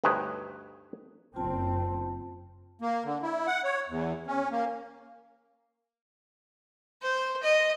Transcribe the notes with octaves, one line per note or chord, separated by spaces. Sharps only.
D2 G2 D#4 B4 C#5
F#1 C4 F4 A5
A#3
D3
E4
F#5
C#5
E2
C#4
A#3
C5
D#5